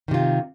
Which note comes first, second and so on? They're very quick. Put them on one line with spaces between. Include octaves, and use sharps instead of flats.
D#3 C3 F4